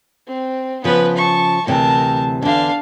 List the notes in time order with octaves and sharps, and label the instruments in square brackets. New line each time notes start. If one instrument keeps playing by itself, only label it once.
[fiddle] C4
[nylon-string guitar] C#3 F3 [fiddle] B3 B4
[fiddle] A5 C#6
[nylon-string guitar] D2 C3 E3 [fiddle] A#4 A5
[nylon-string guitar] E2 D3 [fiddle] D4 F5